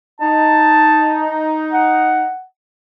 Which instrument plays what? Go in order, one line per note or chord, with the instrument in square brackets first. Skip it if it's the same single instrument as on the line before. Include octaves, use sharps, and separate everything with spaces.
[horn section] D#4 [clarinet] A5
[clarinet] F#5